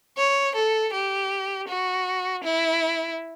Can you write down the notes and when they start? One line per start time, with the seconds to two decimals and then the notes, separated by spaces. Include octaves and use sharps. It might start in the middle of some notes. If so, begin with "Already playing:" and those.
0.18 C#5
0.55 A4
0.93 G4
1.68 F#4
2.43 E4